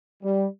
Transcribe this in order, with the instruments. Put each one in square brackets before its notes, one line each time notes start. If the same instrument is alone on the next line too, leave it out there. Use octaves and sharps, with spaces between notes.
[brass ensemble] G3